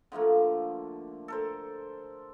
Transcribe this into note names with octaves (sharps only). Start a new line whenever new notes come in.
D3 F3 A3 A#3
A4 A#4 C5